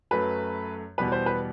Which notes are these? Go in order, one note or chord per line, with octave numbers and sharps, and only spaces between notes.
F#2 F#3 A3 B4
E2 B2 G3 B3 B4
C5
B4